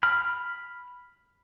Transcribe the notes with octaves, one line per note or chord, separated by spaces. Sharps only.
B5 F6